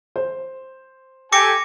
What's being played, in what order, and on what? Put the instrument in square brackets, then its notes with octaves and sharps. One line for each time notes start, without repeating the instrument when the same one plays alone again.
[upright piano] C5
[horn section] G4 A4 G#5 [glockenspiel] D6 A#6 C#7